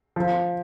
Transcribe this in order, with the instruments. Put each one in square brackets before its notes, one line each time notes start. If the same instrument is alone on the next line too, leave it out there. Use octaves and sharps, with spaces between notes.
[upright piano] F3